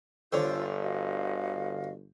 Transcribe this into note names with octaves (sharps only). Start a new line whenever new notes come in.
G1 D3 F4 C5 C#5 E6 G6
F#4 D#5 F5